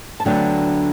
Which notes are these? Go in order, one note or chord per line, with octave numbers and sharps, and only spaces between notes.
A5
D2 D3 F#3 B3 D4 G5